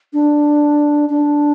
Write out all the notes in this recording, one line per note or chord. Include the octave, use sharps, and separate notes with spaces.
D4
D4